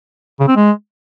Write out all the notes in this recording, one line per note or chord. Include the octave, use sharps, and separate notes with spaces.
C#3
C4
G#3